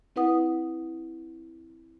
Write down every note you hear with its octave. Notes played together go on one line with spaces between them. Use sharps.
C4 E4 B4 F#5 D#6